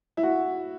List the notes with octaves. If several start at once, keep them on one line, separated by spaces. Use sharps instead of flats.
E4
F#4